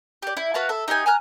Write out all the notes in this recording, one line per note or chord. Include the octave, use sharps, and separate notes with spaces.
G4 D5
E4
F#4 B4 F5 A5
A4 E5
D#4 G4 G5 G#5
G#5 A#5 F6 F#6